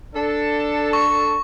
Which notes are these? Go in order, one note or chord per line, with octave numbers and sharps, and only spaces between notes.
D4 A4
C#6